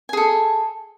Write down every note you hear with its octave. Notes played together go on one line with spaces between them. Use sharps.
G#4 A4 G#5